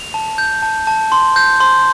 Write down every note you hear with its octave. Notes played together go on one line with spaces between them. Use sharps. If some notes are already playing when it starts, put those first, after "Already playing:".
Already playing: F7
A5
G6
A5
A5
C6
G6
C6